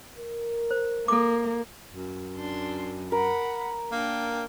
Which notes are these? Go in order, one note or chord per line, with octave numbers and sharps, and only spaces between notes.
A#4
C5
A#3 A4 D6
F#2
D4 C6
A#4 F#5 B5
A#3 D4 G5